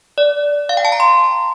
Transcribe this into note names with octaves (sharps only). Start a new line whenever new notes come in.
D5
F5
G5
A5
A#5
C6